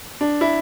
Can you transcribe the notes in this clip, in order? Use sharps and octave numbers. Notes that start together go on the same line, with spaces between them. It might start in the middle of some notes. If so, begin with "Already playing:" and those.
D4
E4